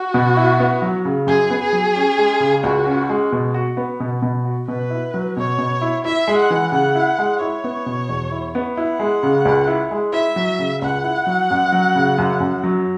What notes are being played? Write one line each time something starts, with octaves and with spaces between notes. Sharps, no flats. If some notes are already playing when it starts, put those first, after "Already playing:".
Already playing: F#4
B2
E4
B3
F#3
C#3
F#2 G#4
B3
G#4
F#3
C#4
G#3
C#3
C#2 F#4
C#4
G#3
B2
F#4
B3
B2
B2
F#4
B2 B4
E4
F#3
B2 C#5
B2
E4
E4 E5
G#3
F#5
E3
C#3 F#5
E4
G#3
E4 C#5
B3
B2
E2
E4
B3
E4 F#5
G#3
C#3
C#2
E4
G#3
E4 E5
F#3
C#3
C#2 F#5
E4
F#3
F#2
F#3
C#3
F#2
F#2
F#3